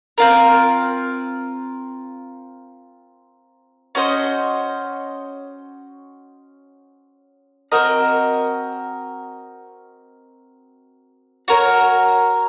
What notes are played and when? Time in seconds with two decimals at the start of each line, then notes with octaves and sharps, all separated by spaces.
0.18 C4 F4 A#4
3.95 C#4 F#4 C5 D#5
7.72 C4 F#4 A#4 D#5
11.48 F#4 A#4 C#5